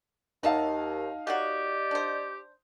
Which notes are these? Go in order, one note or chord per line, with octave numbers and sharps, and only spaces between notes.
D#2 F#3 D#4 E5 F5 A5
F#3 A#3 F#4 G4 D5 D#5
D4 C5